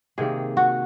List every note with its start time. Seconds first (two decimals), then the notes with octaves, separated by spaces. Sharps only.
0.18 C3 D#3 A#3 G#4
0.57 F#4